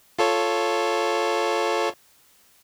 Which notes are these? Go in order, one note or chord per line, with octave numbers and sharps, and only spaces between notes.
F4 A4 C#5